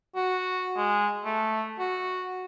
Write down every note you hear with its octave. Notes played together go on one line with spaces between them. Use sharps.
F#4
G#3
A3
F#4